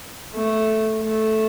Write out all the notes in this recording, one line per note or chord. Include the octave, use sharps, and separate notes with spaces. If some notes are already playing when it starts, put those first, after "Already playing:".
A3
A3